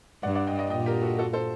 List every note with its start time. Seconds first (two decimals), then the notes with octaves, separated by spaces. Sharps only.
0.23 G2 D5 F#5
0.35 D5 F#5
0.47 D#5 G5
0.59 D#5 G5
0.70 A#2 D#5 G5
0.86 G4 A#4
1.02 F#4 A4
1.18 F#4 A4
1.33 A4 C5